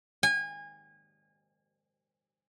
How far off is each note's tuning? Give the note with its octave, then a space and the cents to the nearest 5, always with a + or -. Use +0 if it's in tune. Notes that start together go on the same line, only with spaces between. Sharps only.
G#5 -30